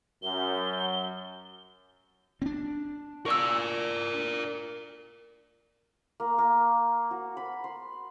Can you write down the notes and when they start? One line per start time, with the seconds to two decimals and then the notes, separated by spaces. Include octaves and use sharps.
0.23 F#2 G7
2.42 C4 D4
3.26 A#4 D5 C#6 E6
6.20 A#3
6.38 A#3
7.11 F#4
7.37 B5
7.64 C6